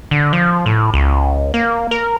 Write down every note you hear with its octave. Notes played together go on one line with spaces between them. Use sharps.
D3
F3
A2
C#2
A#3
A#4